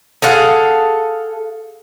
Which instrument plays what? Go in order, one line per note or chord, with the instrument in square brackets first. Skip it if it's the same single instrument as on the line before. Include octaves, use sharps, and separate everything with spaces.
[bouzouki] G#4 A4 F5 F#5